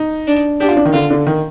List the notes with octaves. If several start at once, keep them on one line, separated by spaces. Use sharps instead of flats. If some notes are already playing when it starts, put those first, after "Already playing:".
Already playing: D#4
D4
D4 G4
F4
D4
D#3
D3 F4
D3
D#3